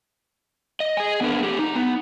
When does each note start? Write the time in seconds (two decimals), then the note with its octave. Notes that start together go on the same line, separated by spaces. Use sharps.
0.80 D#5
0.97 G#4 G#5
1.21 B3 D4 A#4
1.43 A3 G4
1.59 D#4
1.75 B3